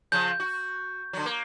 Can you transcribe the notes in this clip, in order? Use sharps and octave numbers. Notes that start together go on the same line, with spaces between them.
C#3 F3 G6
F#4
D3 F#3
A#3